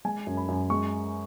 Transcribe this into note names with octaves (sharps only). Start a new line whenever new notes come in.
G#3 G#5
F#2
B5
F#2
G#3 C#6